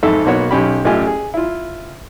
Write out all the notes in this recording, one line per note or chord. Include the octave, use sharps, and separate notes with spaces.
G#1 F2 G#2 A4 E5
B1 A#3 B3 F#4 C#5
B1 C#4 G4 B5
A1 F#2 A3 F4 G4 G#5
G#4
E4 F4